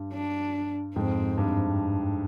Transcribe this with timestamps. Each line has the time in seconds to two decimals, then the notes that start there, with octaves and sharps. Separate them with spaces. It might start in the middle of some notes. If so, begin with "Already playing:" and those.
Already playing: G2
0.13 D4
0.96 F2 G#2 C4
1.37 G2